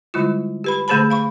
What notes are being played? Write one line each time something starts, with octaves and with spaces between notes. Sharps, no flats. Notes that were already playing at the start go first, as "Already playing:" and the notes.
D3 G3 G#3 E4 F4
G4 B4 B5
D3 A3 G#4 C5 A5 B5
F5 B5 C#6